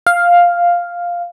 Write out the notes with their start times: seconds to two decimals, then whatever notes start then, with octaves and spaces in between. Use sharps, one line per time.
0.07 F5